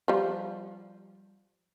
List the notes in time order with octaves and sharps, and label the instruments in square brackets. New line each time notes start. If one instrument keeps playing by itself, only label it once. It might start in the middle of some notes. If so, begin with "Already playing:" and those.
[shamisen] F3 G3